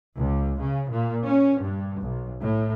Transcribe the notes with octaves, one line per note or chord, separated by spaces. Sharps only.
C#2
C#3
A#2
C#4
G2
B1
A2